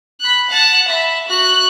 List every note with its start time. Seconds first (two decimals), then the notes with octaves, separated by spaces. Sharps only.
0.21 B5 F#6
0.50 F#5 A5
0.88 E5 B5
1.28 F#4 F#6